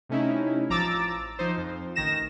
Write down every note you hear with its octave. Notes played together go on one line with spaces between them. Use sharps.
C3 A3 C#4 D#4 E4
A1 F3 A#5 D6 E6 A6
F3 D#4 C5
F2
A1 D#3 A#6 E7